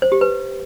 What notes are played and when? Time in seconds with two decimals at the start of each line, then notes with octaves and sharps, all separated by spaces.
0.02 C5
0.12 G4
0.21 B4